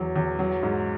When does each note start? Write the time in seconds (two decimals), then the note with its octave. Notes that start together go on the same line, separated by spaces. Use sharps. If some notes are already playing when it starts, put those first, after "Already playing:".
Already playing: E2 F#3
0.16 E2
0.39 F#3
0.63 G#2